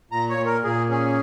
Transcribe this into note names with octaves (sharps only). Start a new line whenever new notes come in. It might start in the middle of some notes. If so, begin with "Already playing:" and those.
A#2 A#5
C#5
A#2
A#4
A#2 G#4
C#4 G#4